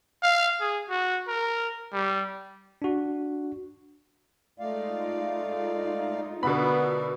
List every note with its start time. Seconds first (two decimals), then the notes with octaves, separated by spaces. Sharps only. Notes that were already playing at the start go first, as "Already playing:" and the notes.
0.23 F5
0.60 G#4
0.89 F#4
1.28 A#4
1.93 G3
2.82 D4 F#4
4.60 G#3 A3 D#4 F4 D5 F5
6.43 B2 D3 B3 A#4 D5 E5 B5